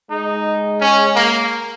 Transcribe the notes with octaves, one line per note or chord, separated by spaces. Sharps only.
G#3 D#4
C#4
A#3